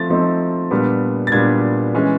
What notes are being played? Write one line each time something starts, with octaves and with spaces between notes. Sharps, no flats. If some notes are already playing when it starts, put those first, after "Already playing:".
Already playing: F3 A3 C4 A6
F3 A3 C4 D#4
A#2 G3 B3 D4
A6
A#2 G3 B3 D4 G#6
E3 G#3 C#4